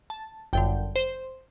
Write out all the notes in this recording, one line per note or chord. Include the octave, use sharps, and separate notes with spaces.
A5
G1 F#2 D3 G5
C5